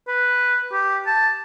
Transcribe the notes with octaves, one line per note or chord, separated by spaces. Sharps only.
B4
G4
A5